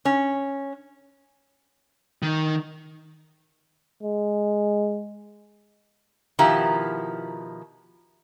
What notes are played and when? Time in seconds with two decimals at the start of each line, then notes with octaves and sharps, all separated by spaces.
0.05 C#4
2.22 D#3
4.03 G#3
6.39 B2 D#3 F3 E4 G4 A#5